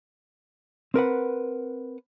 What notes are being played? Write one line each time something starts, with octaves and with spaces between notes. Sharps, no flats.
C4 A#4 B4 F#5